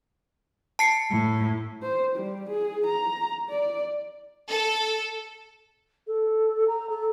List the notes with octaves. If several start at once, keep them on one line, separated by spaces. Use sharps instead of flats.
A5 C7 C#7
A2
C5
G3
G#4
A#5
D5
A4
A4
A#5
A4